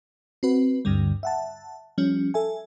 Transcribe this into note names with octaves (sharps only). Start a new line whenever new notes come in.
C4 F#4 B4
D2 G2 D3 G3
E5 F#5 A5
F3 G3 C#4
A4 E5 G#5